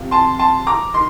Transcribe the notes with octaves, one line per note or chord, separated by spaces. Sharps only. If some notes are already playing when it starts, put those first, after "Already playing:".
Already playing: C3 F3
A5 C6
A5 C6
A#5 D6
D#3 C6